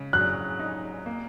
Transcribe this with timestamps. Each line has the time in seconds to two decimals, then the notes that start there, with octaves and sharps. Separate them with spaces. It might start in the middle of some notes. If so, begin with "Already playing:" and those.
Already playing: C#3 G#3
0.13 F#3 F#6
0.60 D#4
1.06 A#3